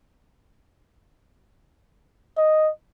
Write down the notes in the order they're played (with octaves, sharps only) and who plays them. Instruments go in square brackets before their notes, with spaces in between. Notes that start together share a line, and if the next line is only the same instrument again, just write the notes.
[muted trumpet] D#5